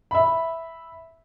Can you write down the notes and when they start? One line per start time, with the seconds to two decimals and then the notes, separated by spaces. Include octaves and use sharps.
0.11 E5 B5